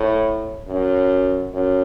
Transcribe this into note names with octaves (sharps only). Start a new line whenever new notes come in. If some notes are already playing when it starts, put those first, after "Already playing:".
Already playing: A2
F#2
F#2